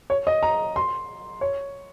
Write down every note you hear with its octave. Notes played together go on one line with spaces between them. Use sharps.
C#5
D#5
A#5
C6
C#5